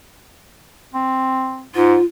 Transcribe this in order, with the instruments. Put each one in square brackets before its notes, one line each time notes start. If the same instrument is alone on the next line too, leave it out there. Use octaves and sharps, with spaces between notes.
[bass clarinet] C4
[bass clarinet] G#2 [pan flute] F4